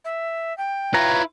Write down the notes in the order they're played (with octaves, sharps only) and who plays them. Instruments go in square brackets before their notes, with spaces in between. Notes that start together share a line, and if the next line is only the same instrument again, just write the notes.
[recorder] E5
G5
[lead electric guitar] E4 F4 [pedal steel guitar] B4 C#5 A#5